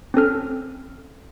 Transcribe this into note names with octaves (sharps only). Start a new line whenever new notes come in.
C4 C#4 A4 F6